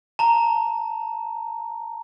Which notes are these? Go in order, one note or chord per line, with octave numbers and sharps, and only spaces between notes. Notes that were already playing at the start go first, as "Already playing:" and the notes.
A5 A#5